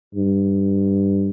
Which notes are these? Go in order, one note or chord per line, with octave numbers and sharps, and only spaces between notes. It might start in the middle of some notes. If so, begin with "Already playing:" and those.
G2